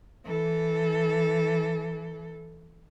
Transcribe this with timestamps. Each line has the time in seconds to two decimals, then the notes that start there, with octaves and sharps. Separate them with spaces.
0.25 E3 A4